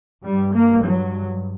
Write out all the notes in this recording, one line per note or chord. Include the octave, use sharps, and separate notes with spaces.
G2 G3
A#3
F#3